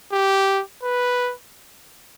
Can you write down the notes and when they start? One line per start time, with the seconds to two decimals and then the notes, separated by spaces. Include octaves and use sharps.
0.12 G4
0.83 B4